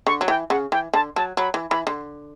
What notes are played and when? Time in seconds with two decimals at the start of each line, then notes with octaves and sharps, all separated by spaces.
0.07 D3 C#6
0.21 F#3
0.28 E3 G5
0.50 C#3 F#5
0.72 E3 G5
0.94 D3 A5
1.16 F#3 A5
1.37 F#3 B5
1.54 E3
1.70 E3 B5
1.87 D3